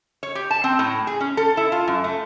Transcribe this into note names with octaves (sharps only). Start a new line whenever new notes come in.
C#5
G4
A5
C4
A2
G#4
C#4
A4
E4
F4
F#2
A3